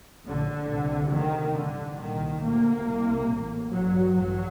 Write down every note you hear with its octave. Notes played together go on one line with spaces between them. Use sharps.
A#1 A2 D3
C2 C3
D2 C3 D#3
A1 G2 D3
C2 A#2 D#3
D2 C3 A#3
C2 C3
A1 A2
A1 G2 F#3
A1 G2 F#3